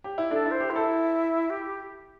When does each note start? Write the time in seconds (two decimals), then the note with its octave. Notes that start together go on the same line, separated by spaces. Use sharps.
0.04 G4
0.18 E4
0.31 D4 A4
0.46 E4
0.51 C5
0.60 G4
0.71 E4
0.76 A4
1.50 G4